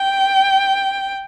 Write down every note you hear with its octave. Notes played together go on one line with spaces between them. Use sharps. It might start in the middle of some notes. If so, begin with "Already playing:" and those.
Already playing: G5